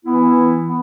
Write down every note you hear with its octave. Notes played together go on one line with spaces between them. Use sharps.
E3 B3 E4
E3 B3